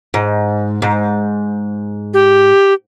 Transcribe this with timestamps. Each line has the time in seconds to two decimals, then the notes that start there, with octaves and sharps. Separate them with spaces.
0.14 G#2
0.82 G#2
2.14 G4